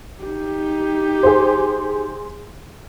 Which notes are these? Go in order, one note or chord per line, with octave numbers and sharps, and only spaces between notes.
D#4 G4
G#4 C5